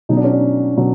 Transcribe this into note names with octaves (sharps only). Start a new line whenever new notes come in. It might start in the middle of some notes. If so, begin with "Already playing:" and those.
B2 F#3 D#4
D4
C#4
D4
B2 F#3